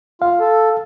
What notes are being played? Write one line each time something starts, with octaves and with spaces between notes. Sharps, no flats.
F4 F5
A4